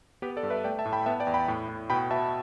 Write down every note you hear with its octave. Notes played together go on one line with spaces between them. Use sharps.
B3 G4 B4
A4 D5
G2
B4 E5
A3 D5 G5
E5 A5
A2
G5 B5
B3 E5 A5
D5 G5
E2
G5 B5
A2
A2
B2 G5 B5
B2 E5 A5